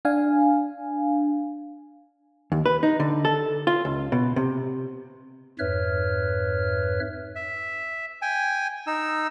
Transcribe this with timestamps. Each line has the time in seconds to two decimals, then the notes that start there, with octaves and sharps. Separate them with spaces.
0.05 D4 F5 G#5
2.52 D#2
2.66 B4
2.83 D#4
3.00 D3
3.25 A4
3.67 F4
3.85 C#2
4.12 B2
4.36 C3
5.59 F2 G#2 B4 C#5 E5 F6
7.36 E5
8.22 G5 G#5
8.87 D#4 E6